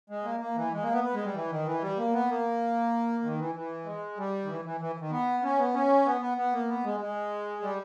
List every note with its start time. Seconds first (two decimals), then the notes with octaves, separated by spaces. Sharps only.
0.10 G#3
0.24 A#3
0.40 A#3
0.56 E3
0.73 G#3
0.82 A#3
0.93 B3
1.04 B3
1.14 G#3
1.25 G3
1.34 E3
1.51 D#3
1.66 E3
1.82 G3
1.98 A#3
2.13 B3
2.30 A#3
3.24 D#3
3.38 E3
3.55 E3
3.85 G#3
4.18 G3
4.45 D#3
4.48 E3
4.65 E3
4.81 E3
5.00 D#3
5.11 B3
5.43 C#4
5.59 B3
5.74 C#4
6.06 B3
6.21 B3
6.38 B3
6.53 A#3
6.68 B3
6.84 G#3
7.00 G#3
7.62 G3